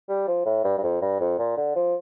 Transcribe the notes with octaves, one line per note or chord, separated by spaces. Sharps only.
G3
F3
A2
G2
G2
F2
G2
F2
A#2
D3
F3